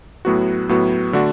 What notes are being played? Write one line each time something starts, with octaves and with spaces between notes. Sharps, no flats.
A2 F#3 B3 F#4
A2 F#3 B3 F#4
D3 A3 D4 F#4